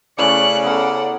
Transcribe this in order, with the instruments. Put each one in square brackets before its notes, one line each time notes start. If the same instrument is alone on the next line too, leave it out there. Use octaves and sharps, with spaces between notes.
[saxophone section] C#3 D5 [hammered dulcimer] A3 C#4 E4 [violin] F#6 C#7
[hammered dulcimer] B3 A#4 [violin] A4 F#5